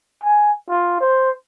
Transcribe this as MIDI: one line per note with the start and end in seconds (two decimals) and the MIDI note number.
0.24 0.52 80
0.70 0.99 65
1.00 1.30 72